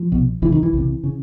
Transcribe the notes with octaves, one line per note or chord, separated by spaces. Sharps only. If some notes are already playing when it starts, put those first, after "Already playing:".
Already playing: F3
C2 B2
C#2 C3 E3
D#3
E3
C2
C3
C#3